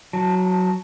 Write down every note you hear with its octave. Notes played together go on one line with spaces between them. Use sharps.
F#3 A5
A5